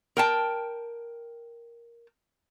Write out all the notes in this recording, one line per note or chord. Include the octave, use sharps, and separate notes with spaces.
A#4 G5 A5